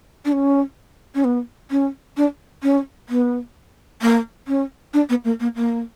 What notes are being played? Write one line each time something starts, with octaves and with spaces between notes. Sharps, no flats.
D4
C#4
C#4
B3
C#4
D4
C#4
B3
A#3
C#4
D4
B3
A#3
A#3
A#3